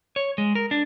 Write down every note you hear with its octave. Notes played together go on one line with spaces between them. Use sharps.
C#5
G#3
A#4
D4